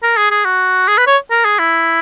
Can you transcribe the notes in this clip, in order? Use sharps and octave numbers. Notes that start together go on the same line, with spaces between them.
A#4
G#4
G#4
F#4
G#4
B4
C#5
A#4
G#4
E4